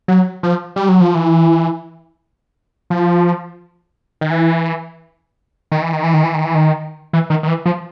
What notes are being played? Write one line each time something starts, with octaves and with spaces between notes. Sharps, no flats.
F#3
F3
G3
F#3
F3
E3
F3
D#3
E3
D#3
E3
D#3
E3
D#3
E3
D#3
E3
D#3
E3
D#3
D#3
E3
F3